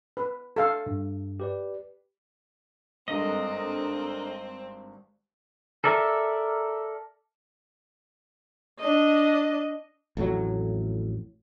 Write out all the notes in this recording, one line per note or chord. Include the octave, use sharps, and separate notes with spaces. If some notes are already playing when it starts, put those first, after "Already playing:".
B4
A4 F5
G2
G4 B4 D5
G#1 G2 C4 D4 A4 A#4 D#5
A4 A#4 D5 E5
D4 D#5
A1 F2 A2 F#3